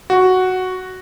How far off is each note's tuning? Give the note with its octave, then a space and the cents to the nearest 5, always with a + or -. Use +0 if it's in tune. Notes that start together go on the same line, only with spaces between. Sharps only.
F#4 +0